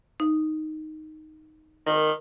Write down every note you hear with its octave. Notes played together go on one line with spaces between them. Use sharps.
D#4
D#3 A#4